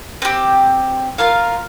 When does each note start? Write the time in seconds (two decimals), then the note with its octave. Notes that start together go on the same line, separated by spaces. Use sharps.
0.22 C4 G4
1.18 F4 A#4 F5